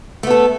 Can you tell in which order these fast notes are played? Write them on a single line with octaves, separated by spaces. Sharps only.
A3 B3 A4